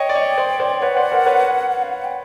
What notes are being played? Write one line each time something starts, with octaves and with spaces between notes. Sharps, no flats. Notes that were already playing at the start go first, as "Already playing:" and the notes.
Already playing: C#5 D#5 G5
D5
C#5 D#5
C5 D5
C5 D5
B4 C#5 F#5
C5 D5
A#4 C5
B4 C#5
F#5
F5
F#5
G5